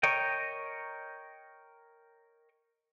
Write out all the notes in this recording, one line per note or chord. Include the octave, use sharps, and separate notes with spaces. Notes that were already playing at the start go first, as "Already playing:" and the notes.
A#4 C#5 D#5 G5